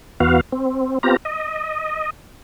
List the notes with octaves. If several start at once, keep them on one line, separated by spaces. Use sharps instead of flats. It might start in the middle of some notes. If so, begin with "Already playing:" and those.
E2 B3 F#4 F5
C4
B3 C4 F4 G4 A#5
D#5